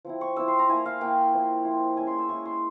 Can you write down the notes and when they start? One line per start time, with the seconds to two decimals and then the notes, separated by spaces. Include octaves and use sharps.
0.05 F3 C4 E4
0.21 C#6
0.36 F3 C4 E4 E6
0.48 C6
0.59 A#5
0.69 A#3 E4 G#5
0.86 F5
1.01 A#3 E4 G5
1.34 F3 C4 E4
1.64 F3 C4 E4
1.96 G#3 C#4 E4 G#5
2.07 C6
2.18 E6
2.29 G#3 C#4 E4 C#6
2.45 C6